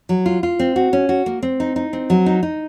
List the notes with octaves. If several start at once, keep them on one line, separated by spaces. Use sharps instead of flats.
F#3
F4
F4
C4
F#4
C#4
F#4
A#3
C4
D#4
D#4
C4
F#3
D#4
D#4